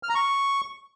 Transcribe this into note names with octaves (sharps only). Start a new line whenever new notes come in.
F6
A#5
C#6